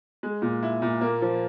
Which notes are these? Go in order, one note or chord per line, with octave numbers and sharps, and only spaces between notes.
G#3
A#2
E4
A#2
A#3
F3